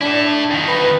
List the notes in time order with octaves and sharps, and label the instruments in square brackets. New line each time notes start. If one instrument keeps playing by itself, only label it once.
[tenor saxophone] D4 [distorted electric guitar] E4 A4
[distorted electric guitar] F2 D#3
[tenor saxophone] B4